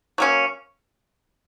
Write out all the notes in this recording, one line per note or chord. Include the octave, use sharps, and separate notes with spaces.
F#3 A#3 C#4